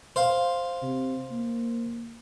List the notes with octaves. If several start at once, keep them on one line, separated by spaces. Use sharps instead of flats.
C5 F5
C3
A#3